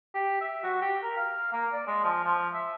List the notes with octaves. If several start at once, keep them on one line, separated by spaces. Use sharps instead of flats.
G4
E5
F#4
G4
A#4
F5
A#3
D5
G#3
F3
F3
E5